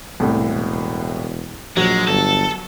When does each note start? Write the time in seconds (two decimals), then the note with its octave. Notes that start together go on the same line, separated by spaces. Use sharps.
0.20 E1 C2 A2
1.77 A#1 F#3 G#3
2.08 G1 A4